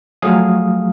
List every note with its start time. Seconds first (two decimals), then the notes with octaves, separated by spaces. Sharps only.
0.22 F3 F#3 A3 G#4 F5 D#6